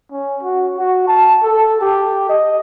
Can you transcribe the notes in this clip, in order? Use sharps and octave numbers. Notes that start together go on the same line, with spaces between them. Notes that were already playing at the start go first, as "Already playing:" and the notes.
C#4
F#4
F#4
A5
A4
G4
D#5